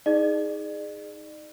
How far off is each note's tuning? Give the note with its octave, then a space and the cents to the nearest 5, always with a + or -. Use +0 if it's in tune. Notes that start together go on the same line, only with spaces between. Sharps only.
D#4 +20 G#4 +0 D5 +40